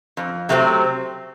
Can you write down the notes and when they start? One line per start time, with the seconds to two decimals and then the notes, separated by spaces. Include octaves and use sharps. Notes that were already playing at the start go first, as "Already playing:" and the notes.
0.17 F2
0.49 C3 F#3 A3 C4